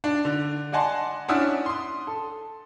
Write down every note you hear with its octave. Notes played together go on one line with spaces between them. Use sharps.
D4
D3
D5 D#5 F#5 G#5 A5 C6
C#4 D4 E4 F#5 D#6 E6
C6 D#6
A4